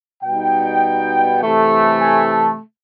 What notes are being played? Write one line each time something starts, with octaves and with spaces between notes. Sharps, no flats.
B2 G3 B3 D#4 G5
C3 E3 A3
G#5
A5